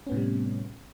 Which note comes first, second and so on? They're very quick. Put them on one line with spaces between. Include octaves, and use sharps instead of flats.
C#4 B3 A2 C3 G3